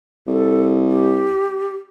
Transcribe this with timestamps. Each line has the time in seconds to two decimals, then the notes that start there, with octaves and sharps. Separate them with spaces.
0.27 C2 A4
0.89 G4